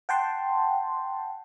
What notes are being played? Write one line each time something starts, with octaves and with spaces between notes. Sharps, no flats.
F#5 G5 A5 C6